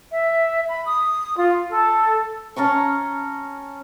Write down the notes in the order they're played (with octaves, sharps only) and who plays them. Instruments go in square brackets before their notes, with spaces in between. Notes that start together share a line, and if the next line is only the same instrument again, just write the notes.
[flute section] E5
B5
D#6
F4
A4
[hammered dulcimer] C#4 A5 A#5 C#6